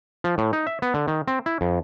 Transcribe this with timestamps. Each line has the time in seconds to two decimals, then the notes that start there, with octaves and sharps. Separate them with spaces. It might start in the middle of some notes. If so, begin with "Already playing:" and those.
0.24 F3
0.38 A2
0.53 D#4
0.67 E5
0.82 B3
0.94 D3
1.08 D#3
1.28 C4
1.46 E4
1.61 F2